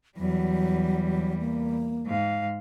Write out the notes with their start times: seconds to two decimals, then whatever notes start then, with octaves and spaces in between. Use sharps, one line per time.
0.17 E2 F#3 G3
1.39 A#3
2.06 G#2 F5